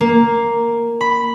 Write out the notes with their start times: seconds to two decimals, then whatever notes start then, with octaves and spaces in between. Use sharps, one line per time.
0.01 A#3
1.01 B5